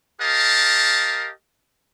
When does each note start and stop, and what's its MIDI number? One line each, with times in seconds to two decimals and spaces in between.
0.21 1.30 67
0.21 1.30 70
0.21 1.30 75
0.21 1.30 77
0.21 1.30 81